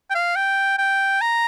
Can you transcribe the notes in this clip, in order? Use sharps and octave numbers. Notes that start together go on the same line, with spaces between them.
G5
F5
G5
G5
A#5